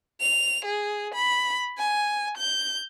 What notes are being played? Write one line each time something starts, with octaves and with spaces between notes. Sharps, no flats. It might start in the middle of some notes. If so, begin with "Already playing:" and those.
F7
G#4
B5
G#5
G6